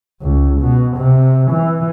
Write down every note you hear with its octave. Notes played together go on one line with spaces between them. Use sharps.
C#2
B2
C3
E3